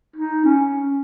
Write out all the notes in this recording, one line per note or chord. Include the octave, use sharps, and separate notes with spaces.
D#4
C#4